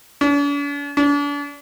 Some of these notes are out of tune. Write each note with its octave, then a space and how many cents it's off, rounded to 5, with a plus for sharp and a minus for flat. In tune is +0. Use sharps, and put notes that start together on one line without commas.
D4 -45
D4 -35